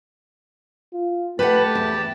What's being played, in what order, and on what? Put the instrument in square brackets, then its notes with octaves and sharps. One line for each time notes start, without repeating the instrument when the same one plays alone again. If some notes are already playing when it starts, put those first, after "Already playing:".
[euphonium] F4
[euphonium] A3 [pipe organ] G4 A5 [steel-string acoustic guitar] B4 F#5
[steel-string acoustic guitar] E2